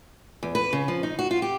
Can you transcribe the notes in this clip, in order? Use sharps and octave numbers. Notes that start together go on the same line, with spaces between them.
E2
B4
C#3
F3
D#4
F#4
F4
G4